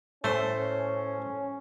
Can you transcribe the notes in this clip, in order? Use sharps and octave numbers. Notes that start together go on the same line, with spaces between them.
A2 A3 C#4 C5